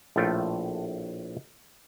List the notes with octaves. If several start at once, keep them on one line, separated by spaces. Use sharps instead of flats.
A#1 A2 A3 F4 G5